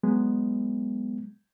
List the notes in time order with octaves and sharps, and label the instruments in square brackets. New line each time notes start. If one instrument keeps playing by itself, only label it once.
[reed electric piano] F#3 G#3 B3